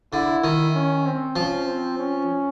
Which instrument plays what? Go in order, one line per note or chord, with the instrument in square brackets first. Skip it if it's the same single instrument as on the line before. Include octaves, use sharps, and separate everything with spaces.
[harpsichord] D3 [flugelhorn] E4
[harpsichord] D#3
[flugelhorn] C#4
C4
[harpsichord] F3 [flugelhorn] C#4
[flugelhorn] C4
C#4